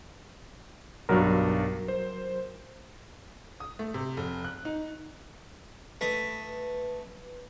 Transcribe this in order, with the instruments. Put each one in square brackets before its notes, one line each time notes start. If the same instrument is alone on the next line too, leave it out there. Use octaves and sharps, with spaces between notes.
[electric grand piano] B1 G2 [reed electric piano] F#3 F#4 A#4
[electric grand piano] C5
[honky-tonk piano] D#6
A3
C3
F1
F#6
D#4
[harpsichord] A3 D#5 [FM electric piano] B4